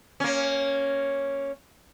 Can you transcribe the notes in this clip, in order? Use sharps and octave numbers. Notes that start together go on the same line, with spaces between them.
A#3 C#4